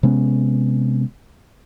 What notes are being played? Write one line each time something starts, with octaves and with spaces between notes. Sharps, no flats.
C3 G#3 B3 C#4